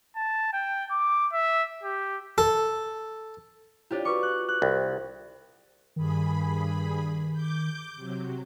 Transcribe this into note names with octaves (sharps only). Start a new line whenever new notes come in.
A5
G5
D6
E5
G4
A4
D4 E4 F4 G4 C5 C#5
F#4 B4 C#6 D6
F#6
F#6
C2 G5
G2 D#3 G#4 B5
D6 G6
C3 F#3